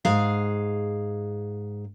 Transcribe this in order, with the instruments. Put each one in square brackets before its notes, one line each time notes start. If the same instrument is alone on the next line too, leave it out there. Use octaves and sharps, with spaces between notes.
[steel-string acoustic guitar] G#2 G#4 F5